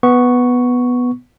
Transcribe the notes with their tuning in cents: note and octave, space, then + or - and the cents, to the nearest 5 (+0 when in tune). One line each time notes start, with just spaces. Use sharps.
B3 +0 C#6 +0